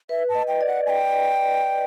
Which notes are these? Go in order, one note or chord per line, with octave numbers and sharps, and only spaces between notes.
B4 E5
A5
D#5
G5
D5
F#5
G#5
G5